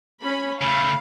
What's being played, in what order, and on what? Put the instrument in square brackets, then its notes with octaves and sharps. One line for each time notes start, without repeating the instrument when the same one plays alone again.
[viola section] C#4 B5
[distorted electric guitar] C#3 A3 [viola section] F5 [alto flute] B5